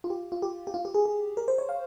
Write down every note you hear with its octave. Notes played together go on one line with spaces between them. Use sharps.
F4
G4
F4
G4
G4
F4
G4
G#4
G#4
A#4
C5
C#5
F5